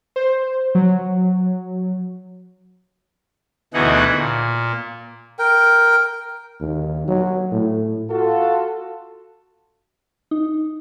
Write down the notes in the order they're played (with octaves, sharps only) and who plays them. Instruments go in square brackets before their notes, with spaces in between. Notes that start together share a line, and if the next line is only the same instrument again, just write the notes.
[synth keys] C5
F#3
[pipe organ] D2 B2 E3 D#4 G#4 F#5
A#2
[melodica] A#4 G5
[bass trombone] D#2
F#3
A2
[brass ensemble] F4 F#4 A4
[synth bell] D#4